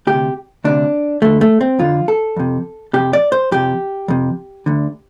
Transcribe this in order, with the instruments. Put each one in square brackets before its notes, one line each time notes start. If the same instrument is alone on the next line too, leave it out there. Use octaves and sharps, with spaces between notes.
[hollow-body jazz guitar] D2 G4
C3
D2 C3 D4
F2 D3 A3
A3
C4
F2 D3 F4
A4
F2 C3
F2 C3 G4
D5
C5
F2 C3 G4
F2 C3
D2 D3